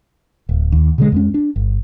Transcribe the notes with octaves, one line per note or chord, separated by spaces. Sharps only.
D1
D#2
B2 D3 G#3
F2 G#3 C#4
D4
G1